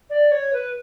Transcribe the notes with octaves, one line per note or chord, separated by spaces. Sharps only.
D5
C#5
B4